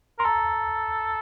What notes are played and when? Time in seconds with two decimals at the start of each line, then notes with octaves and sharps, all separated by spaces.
0.19 A#4 C6
0.25 A4 A#5